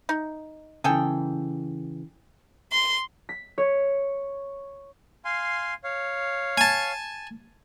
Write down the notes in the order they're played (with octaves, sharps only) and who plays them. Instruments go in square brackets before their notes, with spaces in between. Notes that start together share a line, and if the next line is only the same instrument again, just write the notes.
[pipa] D#4
[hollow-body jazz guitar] C#3 E3 [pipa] G#4 A4 G5
[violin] C6
[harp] B6
C#5
[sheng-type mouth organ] F5 G#5 C6
C#5 F5
[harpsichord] G#5 A5